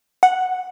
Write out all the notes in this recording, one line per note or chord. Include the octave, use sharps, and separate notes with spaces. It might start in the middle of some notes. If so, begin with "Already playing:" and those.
F#5